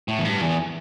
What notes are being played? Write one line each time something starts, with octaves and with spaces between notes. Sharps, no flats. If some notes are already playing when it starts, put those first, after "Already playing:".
A2
E2
G2
E2